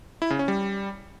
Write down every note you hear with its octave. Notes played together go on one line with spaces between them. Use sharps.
E4
C#3
C#4
G3